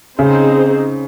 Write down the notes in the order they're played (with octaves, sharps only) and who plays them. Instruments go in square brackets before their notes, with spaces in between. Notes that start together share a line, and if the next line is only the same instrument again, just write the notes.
[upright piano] C#3 [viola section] C4 D#4 G#4 C5